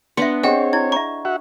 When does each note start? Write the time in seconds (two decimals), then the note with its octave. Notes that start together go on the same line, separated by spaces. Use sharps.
0.17 B3 D4 E5 C6 C#7
0.43 C4 G4 G#4 C5 C#5 D#5 F#5 G5
0.73 E4 G#6
0.92 E5 A#5 C#6
1.25 F#4 E5 F#5